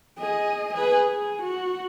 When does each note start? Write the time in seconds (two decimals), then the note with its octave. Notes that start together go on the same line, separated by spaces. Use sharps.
0.18 G#4 D#5
0.73 G#4 B4
1.07 G#4
1.42 F#4